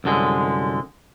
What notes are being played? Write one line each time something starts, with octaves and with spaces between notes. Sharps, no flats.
C2 F#2 D3 G#3